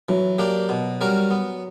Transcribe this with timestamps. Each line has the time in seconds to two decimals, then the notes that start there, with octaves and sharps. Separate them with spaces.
0.09 E3 F#3
0.38 A#3 D4 G4
0.69 B2
1.01 G3 C#4 F#4 A#4
1.31 B3